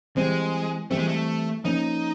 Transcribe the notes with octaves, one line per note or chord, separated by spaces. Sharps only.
E3 G3 G#3 C4
E3 G3 A3 C4
G#3
A3
F3 A#3 C#4 D#4